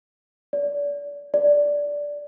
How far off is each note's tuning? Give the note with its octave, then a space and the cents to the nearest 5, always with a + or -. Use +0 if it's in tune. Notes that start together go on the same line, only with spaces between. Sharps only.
D5 -30
D5 -10